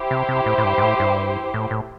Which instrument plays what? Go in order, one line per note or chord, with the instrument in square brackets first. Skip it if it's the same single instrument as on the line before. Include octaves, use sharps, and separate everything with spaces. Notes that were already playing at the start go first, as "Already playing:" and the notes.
Already playing: [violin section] E4 G4 C5
[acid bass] C3
C3
A2
A2
G2
G2
A2
G2
A2
A2